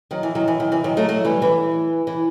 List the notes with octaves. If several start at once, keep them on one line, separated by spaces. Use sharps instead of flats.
D#3 F#3
E3
D#3 F#3
E3
D#3
E3
D#3 F#3
F#3 A3
F#3 A3
E3 G3
E3
E3